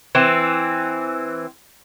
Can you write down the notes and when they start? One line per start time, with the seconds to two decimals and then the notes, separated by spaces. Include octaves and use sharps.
0.15 E3 C4